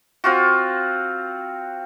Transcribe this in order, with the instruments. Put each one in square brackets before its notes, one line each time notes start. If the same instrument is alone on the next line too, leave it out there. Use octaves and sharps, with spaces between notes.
[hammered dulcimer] C4 F4 F#4